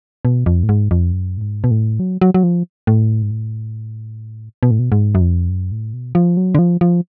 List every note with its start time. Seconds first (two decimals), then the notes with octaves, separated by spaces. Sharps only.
0.25 B2
0.46 F2
0.63 A2
0.69 G#2
0.91 F2
1.12 F#2
1.37 A2
1.41 G#2
1.64 B2
1.71 A2
1.99 F#3
2.21 F#3
2.34 F#3
2.43 F3
2.87 A2
3.22 G#2
3.31 A2
4.63 B2
4.71 A2
4.79 B2
4.92 G#2
5.15 F#2
5.21 F2
5.49 F#2
5.72 A2
5.93 B2
6.15 F3
6.37 F#3
6.55 D3
6.59 F3
6.81 F3